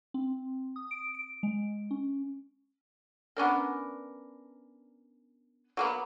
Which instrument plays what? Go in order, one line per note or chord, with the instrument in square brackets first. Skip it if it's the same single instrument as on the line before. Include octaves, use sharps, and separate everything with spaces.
[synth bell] C4
D#6
D7
D7
G#3
C#4
[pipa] B3 C#4 D4 A#4
F#3 A#3 B3